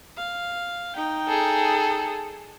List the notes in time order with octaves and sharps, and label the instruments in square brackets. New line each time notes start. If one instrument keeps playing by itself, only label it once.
[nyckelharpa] F5
D#4 G5
[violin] G#4 A4